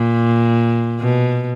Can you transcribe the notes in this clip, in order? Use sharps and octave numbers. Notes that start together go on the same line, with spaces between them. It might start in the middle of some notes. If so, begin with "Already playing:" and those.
Already playing: A#2
B2